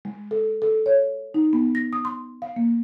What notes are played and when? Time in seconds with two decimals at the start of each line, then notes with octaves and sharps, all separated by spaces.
0.05 G#3
0.31 A4
0.62 A4
0.86 C#5
1.34 D#4
1.53 B3
1.75 A#6
1.93 D#6
2.05 C6
2.42 F5
2.56 A#3